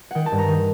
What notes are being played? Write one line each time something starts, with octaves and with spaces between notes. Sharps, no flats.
D#3 F#5 G5
A5
G2
A#5
D#3